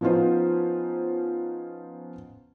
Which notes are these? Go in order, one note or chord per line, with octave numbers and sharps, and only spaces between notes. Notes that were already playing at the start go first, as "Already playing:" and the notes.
F3 B3 C#4 D#4 F4 C5